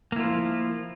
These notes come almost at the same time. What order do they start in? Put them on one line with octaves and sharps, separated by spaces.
A#3 E4 F4 F3